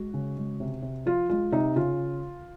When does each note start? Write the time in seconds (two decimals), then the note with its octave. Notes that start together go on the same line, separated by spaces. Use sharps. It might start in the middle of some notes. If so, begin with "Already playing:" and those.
Already playing: G#3 F#4
0.14 C#3
0.37 G#3
0.60 C3
0.82 C3
1.05 F3 F4
1.29 G#3 F4
1.52 C3 D#4
1.76 C#3 F4